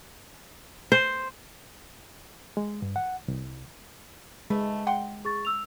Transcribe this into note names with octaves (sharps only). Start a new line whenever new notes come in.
C5
G#3
G2
F#5
C2
G#3 A3 B4
F#5 G5 C6
G#4 C#6 A6
E6 F7